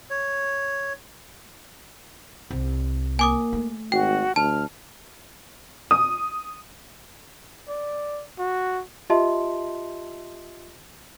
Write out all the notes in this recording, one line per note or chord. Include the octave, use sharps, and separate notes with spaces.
C#5
C2
A#3 G#5 D6 D#6
A3
G#1 F#4 G5
D2 A5 F6
D#6
D5
F#4
F4 G4 D#5 E5 A5 C6